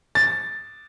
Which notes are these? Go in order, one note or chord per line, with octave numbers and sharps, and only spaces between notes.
A6